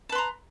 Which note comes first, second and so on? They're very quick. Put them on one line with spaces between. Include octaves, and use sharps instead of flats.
A5 B4 C6 A#5